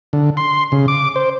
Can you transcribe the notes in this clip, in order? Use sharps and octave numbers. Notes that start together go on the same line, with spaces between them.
D3
C6
C#3
D6
C5